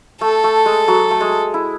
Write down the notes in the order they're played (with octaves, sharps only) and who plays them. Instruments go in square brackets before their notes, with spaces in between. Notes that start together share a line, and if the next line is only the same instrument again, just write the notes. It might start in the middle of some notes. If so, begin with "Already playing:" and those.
[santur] A3 [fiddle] A4
[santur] A3
G#3
F#3
A3
G#3
E4